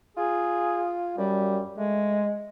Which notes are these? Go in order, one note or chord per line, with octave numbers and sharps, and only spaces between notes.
F4 G#4
F#2 G3
G#3 A3